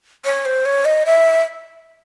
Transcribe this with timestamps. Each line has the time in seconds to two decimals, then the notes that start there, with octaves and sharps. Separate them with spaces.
0.25 C#5
0.45 C5
0.65 C#5
0.85 D#5
1.06 E5